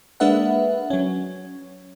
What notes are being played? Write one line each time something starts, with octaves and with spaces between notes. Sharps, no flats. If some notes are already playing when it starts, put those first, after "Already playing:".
G#3 A#3 D4 B4 E5 F#5
F#3 C#4